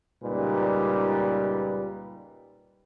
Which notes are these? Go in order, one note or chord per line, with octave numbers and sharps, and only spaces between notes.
C#2 A#2 G3 D#4 B4